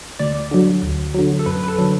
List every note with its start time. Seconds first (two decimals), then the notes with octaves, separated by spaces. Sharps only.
0.19 D2 D5
0.51 D3 F#3
0.82 D2
1.14 D3 F#3
1.39 A4
1.46 F#2 B4
1.63 B4
1.68 A4
1.78 D3 F#3